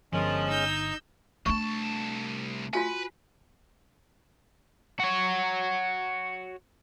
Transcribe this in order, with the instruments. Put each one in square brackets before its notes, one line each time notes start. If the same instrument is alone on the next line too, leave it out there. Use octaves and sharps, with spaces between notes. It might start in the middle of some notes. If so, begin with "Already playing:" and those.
[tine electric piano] G1 [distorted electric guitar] F3 [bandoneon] G#3 C#4 [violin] A#4
[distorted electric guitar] D#4 [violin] E6 G6
[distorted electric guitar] C2 A5 [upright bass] A3 D4 [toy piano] C#6
[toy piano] F4 F#4 G#5 [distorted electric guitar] B4
[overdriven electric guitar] F#4 C#5